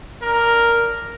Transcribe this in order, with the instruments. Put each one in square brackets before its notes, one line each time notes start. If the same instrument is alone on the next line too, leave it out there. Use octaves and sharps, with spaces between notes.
[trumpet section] D4 A#4